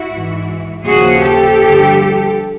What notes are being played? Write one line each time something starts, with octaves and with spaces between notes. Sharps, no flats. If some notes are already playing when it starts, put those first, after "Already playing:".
Already playing: E4 F#4
G#2 E3
D#2 C#3 F3 F#4 G#4
G4 A4
G2 D3 F3